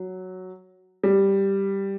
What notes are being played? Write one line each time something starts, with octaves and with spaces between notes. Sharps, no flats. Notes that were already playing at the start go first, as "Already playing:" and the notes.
Already playing: F#3
G3